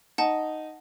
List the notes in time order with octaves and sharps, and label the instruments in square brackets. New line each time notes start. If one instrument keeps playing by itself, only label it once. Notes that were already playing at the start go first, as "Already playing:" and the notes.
[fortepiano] D#4 [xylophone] F#5 A5